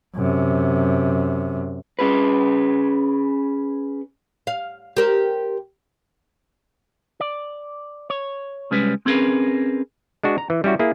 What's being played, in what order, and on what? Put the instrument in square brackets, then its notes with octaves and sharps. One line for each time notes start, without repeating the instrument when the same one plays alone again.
[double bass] F#2 C3
[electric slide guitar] C#4 G#4 B4
[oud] F5
G4 A#4 C5
[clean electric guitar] D5
C#5
C2 G3 G#3 C#4 B4
C4 C#4 G#4 A#4 B4
[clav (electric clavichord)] G#3 D4 F#4
A#5
E3
G3 C#4 E4 F#4
A#3 E4 G#4